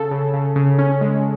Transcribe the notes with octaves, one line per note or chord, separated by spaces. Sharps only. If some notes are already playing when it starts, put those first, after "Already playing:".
Already playing: C#3 A4
C#3
C#3
C#3
C#4
G#3